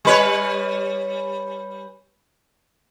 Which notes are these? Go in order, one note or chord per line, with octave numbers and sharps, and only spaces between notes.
G3 B4 C#5